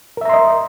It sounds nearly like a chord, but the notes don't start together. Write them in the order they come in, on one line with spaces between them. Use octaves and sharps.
A#4 E5 A#5 C6 D#5